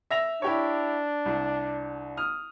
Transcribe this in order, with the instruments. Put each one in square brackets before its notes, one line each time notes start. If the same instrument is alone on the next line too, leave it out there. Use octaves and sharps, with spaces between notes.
[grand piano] E5 A#6 F7
[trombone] D4 [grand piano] E4 G4 C#5
[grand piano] C2
D#6 F6